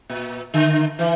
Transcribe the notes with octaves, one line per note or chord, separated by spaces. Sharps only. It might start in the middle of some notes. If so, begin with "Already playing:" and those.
A#2
D3
E3